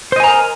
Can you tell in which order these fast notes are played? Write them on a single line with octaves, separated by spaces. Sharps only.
C5 D#5 G#5 A#5 A#4